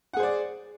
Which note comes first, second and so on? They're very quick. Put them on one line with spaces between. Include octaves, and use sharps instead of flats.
F#5 G#4 C5 D5